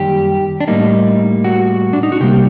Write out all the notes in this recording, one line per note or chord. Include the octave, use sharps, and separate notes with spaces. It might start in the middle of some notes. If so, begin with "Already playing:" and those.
Already playing: F#2 D#3 G3 A#3 G4
D4
A2 G3 A#3 D#4
F#4
D4
D#4
F#4
C3 G3 A#3 G4